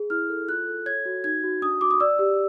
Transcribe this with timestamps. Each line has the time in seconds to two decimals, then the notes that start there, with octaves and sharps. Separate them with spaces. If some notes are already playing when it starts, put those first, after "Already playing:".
Already playing: G#4
0.10 E4 F6
0.30 A4
0.48 F4 F#6
0.67 A4
0.86 C#5 G#6
1.06 F#4
1.24 D#4 G#6
1.44 F#4
1.62 D4 D#6
1.81 F#4 D6
1.91 D#6
2.00 D5 E6
2.19 G4